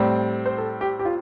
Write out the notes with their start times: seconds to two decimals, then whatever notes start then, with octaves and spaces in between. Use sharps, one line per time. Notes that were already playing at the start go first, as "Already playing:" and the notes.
Already playing: A2 G3 C4
0.46 C5
0.58 A4
0.81 G4
0.99 G4
1.05 F4